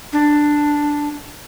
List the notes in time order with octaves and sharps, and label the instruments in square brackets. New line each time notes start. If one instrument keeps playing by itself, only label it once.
[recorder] D4